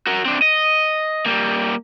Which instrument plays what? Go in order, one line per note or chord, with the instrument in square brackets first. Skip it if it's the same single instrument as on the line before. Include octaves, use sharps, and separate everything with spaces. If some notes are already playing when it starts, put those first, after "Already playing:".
[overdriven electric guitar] F#4 A#4
C4 D4
D#5
G3 A#3